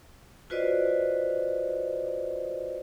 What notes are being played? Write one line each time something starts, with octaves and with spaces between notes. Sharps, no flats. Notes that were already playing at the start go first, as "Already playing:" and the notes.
F4 F#4 B4 C5 D5 D#5